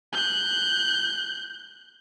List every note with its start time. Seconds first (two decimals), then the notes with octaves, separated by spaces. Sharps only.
0.13 F#6 G6